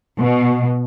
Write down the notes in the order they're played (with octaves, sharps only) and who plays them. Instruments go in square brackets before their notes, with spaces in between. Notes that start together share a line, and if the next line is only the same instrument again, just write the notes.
[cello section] B2